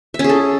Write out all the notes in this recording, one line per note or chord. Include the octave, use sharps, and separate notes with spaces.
E5
C#4
G#4
A4